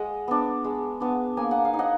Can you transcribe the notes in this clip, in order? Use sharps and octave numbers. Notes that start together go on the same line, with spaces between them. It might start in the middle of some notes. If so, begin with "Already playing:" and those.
Already playing: G#3 D#5 F#5
B3 D4
G#3
B3 D4
A#3 G#5
F#5
F5
D#4
D#5 F#5